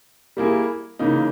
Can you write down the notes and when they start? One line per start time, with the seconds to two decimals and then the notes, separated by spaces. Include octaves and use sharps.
0.37 G3 A#3 E4 G#4
0.99 C#3 E3 A#3 D#4